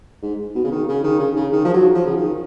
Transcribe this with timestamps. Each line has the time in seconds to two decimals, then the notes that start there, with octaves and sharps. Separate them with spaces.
0.22 G#2
0.55 B2
0.64 C#3
0.71 D#3
0.88 C#3
1.04 D#3
1.19 C#3
1.36 C#3
1.52 D#3
1.65 F3
1.74 F#3
1.95 F3
2.06 C#3
2.17 D#3